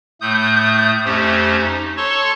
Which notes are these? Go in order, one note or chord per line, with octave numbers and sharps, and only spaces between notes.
A2 A3 D#6 G6
F2 A3 C#4 G4 C5
D#4
A4 C#5 A5 C6 C#6